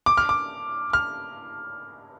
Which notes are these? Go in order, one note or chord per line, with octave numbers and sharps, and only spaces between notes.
D6
F6
D6
F6